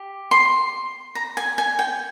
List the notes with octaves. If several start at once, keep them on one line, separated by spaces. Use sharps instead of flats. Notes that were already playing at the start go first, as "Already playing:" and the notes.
Already playing: G4
C6
A#5
G#5
G#5
G5